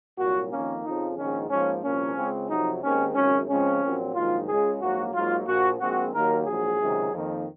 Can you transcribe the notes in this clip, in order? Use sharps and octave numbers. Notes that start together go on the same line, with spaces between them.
C2 A#2 F#3 F#4
F2 D#3 A#3 C#4
F2 C#3 F3 D#4
A#1 G#2 D#3 C#4
G#2 F3 A#3 C#4
C2 A#2 F3 A#3 C#4
C#2 C#3 G#3 C4
F2 C3 F#3 D#4
D#2 D#3 G#3 C4 C#4
G#1 F#2 C#3 C#4
C#2 C#3 F3 G#3 C4 C#4
A#1 A#2 F#3 C4
A#1 G#2 D#3 F#3 F4
C#2 C#3 G#3 G#4
A#1 G#2 F#3 A#3 F#4
G#2 F#3 A#3 F4
A#1 A#2 F3 F#4
A#1 A#2 G#3 C4 F#4
D#2 D#3 F#3 A#3 A#4
A#1 G#2 F#3 G#4
C#2 C3 D#3 F#3
F2 D#3 A#3